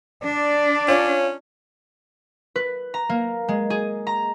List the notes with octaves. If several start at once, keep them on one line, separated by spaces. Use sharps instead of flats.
D4 D5
C#4 F4 C#5
B4
A#5
A#3
G#3
G#4
A#5